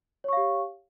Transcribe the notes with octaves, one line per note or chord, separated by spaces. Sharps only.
G4 C#5 F5 C#6